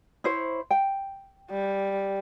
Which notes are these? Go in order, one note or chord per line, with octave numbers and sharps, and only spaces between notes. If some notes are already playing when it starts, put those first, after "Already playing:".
E4 C5 C#5
G5
G3